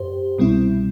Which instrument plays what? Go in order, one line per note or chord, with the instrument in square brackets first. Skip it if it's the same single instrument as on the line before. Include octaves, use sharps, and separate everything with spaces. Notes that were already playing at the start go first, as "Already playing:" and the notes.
Already playing: [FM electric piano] F#2 G4 C5
C2 B2 G3 C4 E4